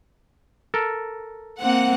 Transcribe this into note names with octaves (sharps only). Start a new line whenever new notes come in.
A4 A#4
A#3 C4 F#5